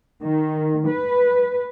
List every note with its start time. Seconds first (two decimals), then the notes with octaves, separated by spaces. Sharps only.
0.23 D#3
0.87 B4